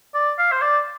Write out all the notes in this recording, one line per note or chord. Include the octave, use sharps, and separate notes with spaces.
D5
F5
C5
D5